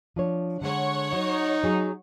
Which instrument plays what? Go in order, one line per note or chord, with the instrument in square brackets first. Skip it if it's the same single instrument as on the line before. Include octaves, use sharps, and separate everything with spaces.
[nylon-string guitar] F3 D4 C#5
[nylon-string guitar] D3 G#3 [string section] C#5 F#5
[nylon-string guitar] F#3 [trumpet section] D#4
[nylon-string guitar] F#3 G#4